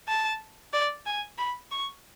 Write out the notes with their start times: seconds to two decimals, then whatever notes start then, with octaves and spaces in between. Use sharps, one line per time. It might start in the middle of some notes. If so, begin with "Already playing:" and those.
0.08 A5
0.73 D5
1.06 G#5
1.38 B5
1.71 C#6